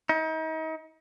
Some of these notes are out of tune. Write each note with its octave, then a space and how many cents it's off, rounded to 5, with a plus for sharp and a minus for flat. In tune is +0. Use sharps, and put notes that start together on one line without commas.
D#4 +35